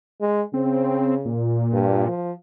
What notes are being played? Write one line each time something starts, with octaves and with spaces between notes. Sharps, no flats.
G#3
C#3 C4
A#2
G2
F3